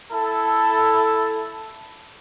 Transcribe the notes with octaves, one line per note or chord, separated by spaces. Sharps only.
E4 A4